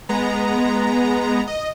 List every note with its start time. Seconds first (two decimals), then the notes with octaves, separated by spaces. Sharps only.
0.09 G#3 B3 A#5
1.47 D#5